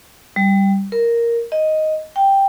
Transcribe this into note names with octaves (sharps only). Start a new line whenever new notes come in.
G3
A#4
D#5
G5